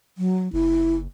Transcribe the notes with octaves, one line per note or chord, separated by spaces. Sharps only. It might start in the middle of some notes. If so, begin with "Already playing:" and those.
F#3
F#1 E4